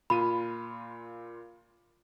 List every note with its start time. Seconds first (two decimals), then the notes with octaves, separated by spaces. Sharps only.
0.10 A#2 F4 B5 D#7